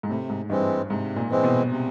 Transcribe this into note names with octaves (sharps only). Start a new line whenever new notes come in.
G#2
A2 C3
G#2
G2 E3 G#3 C4
G#2 C3
A#2
E3 G#3 C4
B2
C3